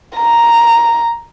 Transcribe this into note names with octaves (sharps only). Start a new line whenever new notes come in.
A#5